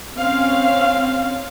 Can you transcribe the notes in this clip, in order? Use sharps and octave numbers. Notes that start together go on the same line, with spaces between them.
C4 C#4 F5